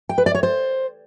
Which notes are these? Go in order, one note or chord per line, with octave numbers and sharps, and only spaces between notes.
G5
B4
D5
C#5
C5